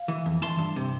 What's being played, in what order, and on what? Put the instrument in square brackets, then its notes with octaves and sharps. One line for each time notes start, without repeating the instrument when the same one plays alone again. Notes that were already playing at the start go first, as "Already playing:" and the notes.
Already playing: [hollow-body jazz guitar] F5
E3
F2
E3 A5 C6
G2
C3